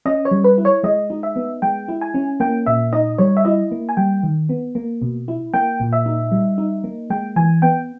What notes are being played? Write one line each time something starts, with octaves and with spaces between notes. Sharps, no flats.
C#4 D#5
C#5
G3
B4
E4
C#5
G#3 D#5
D#4
E5
B3
G#3 G5
E4
G#5
C#4
A#3 G5
A#2 E5
D#4 D#5
G3 C#5
E5
E4 D#5
A#3
G#5
G3 G5
D#3
B3
A#3
B2
E4
A#3 G5
A#2
E5
D#4
G3
D#4
A#3
G#3 G5
E3 G#5
B3 G5